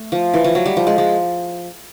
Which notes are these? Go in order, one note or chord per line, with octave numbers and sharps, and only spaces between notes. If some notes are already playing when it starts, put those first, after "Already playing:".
Already playing: A3
F3
E3
F3
F#3
G3
F3
G#3
G#3